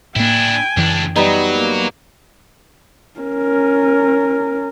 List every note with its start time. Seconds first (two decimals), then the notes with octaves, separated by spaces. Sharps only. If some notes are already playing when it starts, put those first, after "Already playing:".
0.16 A2 A#3 D4 E4 G5 G#5
0.77 C#2 F#2 E3 D4
1.16 F#3 G3 B3 D#4 D#5
1.54 A#3
3.20 C#4 A#4